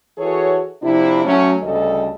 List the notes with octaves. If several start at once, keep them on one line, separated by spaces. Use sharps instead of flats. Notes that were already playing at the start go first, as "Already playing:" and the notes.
E3 F#4 G#4 A4 C#5
C3 F3 D4 E4
F#3 A3 C#4
D2 C#3 G3 A4 D#5